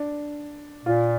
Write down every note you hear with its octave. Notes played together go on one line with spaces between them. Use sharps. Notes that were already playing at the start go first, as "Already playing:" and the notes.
Already playing: D4
A#2 F4